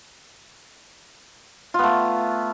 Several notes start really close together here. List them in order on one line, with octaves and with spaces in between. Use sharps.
F4 B3 A3